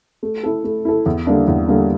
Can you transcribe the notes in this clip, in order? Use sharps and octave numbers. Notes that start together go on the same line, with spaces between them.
A3
E4 A4
A3
E4 A4
E2
D3 G3 A#3 D4
E2
D3 G3 A#3 D4